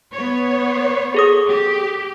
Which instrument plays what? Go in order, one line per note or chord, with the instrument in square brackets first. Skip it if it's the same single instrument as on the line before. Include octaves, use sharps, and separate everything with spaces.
[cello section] B3 C#5
[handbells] G#4 A4 D#6
[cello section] G4